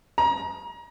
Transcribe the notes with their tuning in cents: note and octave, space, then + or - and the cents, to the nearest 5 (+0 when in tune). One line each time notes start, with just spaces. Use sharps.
A#5 +30